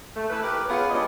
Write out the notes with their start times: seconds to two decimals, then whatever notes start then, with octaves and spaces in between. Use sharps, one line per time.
0.16 A3
0.30 E3 A4 B4
0.42 G4 A#4 B4
0.68 B3 C#4 F4 G#4 C#5
0.91 G2 G#3 D5 D#5